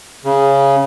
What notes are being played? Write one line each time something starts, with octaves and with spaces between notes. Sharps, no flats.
C#3